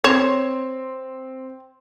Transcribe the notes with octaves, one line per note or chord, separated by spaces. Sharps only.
C4 C#5 C6 E7